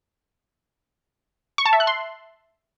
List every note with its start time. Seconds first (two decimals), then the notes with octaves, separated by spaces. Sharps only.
1.58 C#6
1.65 A5
1.73 E5
1.80 F#6
1.87 C6